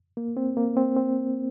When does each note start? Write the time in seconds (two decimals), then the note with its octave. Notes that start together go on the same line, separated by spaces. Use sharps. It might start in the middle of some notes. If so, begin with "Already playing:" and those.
0.17 A#3
0.37 C4
0.57 A#3
0.77 C4
0.97 C4